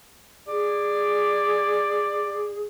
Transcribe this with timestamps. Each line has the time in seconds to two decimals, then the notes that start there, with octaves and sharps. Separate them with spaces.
0.48 G#4 D5